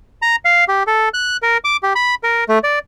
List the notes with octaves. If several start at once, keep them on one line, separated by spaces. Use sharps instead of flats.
A#5
F5
G4
A4
F#6
A#4
D6
G4
B5
A#4
A3
D5